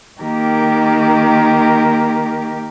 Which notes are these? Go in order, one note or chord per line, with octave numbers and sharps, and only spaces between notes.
D#3 A#3 G4 A#4